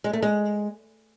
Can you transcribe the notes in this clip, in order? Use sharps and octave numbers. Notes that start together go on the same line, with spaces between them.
G#3
A3
G#3